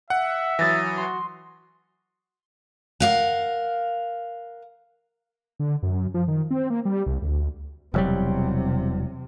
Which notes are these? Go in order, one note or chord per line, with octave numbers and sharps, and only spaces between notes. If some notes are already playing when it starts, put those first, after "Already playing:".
E5 F#5
E3 F#3 D#6 A6 A#6
F#4 C6
A#4 F5 F#5
D3
F#2
F3
D#3
C4
A#3
G3
C2
D2
E1 C3 F#3 G3